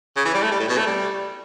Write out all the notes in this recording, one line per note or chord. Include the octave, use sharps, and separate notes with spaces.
C#3
E3
G3
A3
G3
A2
B2
A3
G3